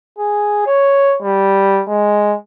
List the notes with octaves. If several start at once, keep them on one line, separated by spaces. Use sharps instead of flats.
G#4
C#5
G3
G#3